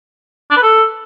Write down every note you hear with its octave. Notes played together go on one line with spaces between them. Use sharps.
D4
B4
A4